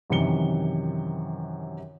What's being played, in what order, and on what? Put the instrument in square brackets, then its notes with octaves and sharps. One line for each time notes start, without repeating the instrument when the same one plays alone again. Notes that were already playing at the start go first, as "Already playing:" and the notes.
[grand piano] F#2 C3 D#3 E3 C#7 G7